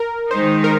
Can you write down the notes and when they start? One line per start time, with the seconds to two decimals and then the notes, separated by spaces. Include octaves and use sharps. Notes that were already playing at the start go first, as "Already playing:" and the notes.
Already playing: A#4
0.31 D#3 G#3 D#4 C5
0.64 A#4